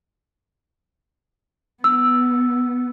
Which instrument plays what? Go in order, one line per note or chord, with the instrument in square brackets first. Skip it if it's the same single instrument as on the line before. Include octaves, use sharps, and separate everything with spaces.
[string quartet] B3 [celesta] E6